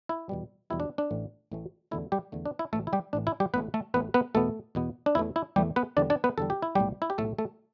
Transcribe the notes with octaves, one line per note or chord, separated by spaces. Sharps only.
E4
E2 B2 G3
E2 B2 G3 E4
D4
D4
A1 A2 E3 A3
A1 A2 E3 A3
E2 D3 A3 E4
G3 G4
E2 D3 A3
D4
E4
A1 A2 E3 A3 A4
E4
G3 G4
A1 A2 E3 D4
E4
G3 G4
A1 A2 A3 B3 B4
A3 A4
A1 A2 A3 B3 B4
B3 B4
E2 B2 A3 B3 A4
E2 B2 B3
D4
E2 E3 A3 E4
E4
E2 E3 G3 A3 G4
B3 B4
E2 D3 G3 D4 D5
D4 D5
B3 B4
E2 D3 G3 A4
G4
E4
B1 A2 G3 A3 G4
E4
G4
B1 A2 A3 A4
A3 A4